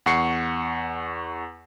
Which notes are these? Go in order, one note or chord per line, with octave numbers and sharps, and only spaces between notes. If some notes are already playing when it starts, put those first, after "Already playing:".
E2 F#5 C#6 C7 C#7